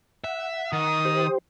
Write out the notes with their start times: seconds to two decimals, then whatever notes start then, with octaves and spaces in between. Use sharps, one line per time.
0.24 E5 F#5
0.73 D#3 D#6
1.05 G4 C5